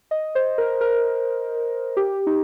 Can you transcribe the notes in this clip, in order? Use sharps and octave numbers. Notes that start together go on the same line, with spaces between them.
D#5
C5
A#4
A#4
G4
D#4